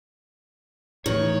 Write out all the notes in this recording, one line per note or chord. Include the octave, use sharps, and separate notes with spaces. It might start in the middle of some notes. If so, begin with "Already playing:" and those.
A2 D#3 E3 C#5